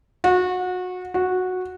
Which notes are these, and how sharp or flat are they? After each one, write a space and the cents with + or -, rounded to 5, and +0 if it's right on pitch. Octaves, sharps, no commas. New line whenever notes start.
F#4 -25
F#4 -10